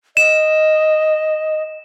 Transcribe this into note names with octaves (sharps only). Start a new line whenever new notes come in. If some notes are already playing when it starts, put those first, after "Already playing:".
D#5 E7